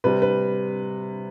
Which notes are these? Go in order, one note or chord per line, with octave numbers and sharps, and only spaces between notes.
C3 G3 B4
B4